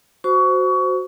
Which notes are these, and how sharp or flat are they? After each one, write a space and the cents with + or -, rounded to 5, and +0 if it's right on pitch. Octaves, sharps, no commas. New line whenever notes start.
F#4 +0 C5 -15 C#6 +25